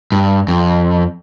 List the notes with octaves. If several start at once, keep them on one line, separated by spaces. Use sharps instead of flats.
G2
F2